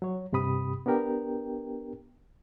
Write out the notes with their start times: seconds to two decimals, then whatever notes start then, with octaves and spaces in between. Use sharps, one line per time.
0.02 F#3 C#5
0.33 G2 C3 G4 B5 D#6
0.86 B3 D4 G4 A#4 G5